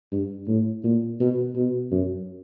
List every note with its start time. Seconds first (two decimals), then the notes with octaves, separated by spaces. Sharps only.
0.12 G2
0.48 A2
0.84 A#2
1.20 B2
1.56 B2
1.91 F#2